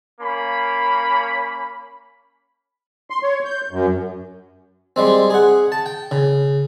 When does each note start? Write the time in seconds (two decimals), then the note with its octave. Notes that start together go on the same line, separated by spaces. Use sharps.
0.21 A#3 C#4 B5
3.10 C6
3.23 C#5
3.45 G6
3.71 F#2
4.96 G3 G#3 C4
5.30 G#4 F#5
5.72 A5
5.86 G5
6.11 C#3